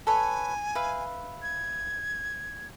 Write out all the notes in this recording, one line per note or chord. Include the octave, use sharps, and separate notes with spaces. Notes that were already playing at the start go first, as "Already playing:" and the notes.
A4 B4 C#5 G#5
B4 E5 F5
G#6